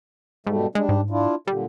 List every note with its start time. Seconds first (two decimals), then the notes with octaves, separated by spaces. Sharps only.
0.47 G#2 B2 G3 A3
0.75 G3 G#3 D4
0.89 G#2
1.10 D4 E4 F4
1.47 A#2 D3 G3